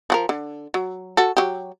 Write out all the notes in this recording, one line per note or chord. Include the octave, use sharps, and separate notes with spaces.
F3 F#4 A#4
D3
F#3
F#4 A4
F#3 G4